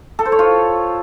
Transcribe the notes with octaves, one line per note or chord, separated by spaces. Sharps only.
A4
C5
C#5
F4